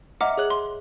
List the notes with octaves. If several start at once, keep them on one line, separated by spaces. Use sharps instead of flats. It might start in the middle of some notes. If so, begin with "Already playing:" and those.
D#5 E5 F#5 A#5 D6 F6
G#4 C#5 F#6 F#7
C6